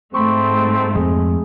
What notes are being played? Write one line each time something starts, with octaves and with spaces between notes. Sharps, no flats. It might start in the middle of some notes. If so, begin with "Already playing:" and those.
G#2 A3 C4 B5 C#6
F2 G#3